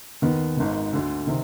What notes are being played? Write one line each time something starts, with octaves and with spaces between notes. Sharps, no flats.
D#2 D#3 B3
G#1 G#2 D#3
D2 D3
C3 D#3